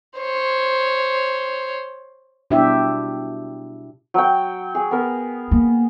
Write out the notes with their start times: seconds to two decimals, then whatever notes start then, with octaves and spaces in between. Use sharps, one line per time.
0.19 C5 C#5
2.51 B2 D4 E4 G4 E5
4.14 F#3 G5
4.75 G#4
4.91 B3 A#4
5.51 A#3